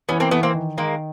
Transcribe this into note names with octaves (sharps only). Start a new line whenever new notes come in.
E3 B3 C#4
A#3 C4
E3 A3 B3
A#3 C4
D#3
D#3 G#3 A#3